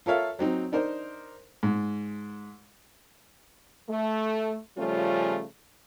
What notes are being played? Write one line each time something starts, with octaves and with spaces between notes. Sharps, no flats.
F4 A4 A#4 C#5 E5 F5
F#3 C4 D#4
D4 D#4 A#4 C5
G#2
A3
C#3 F3 G3 A3 C#4 F4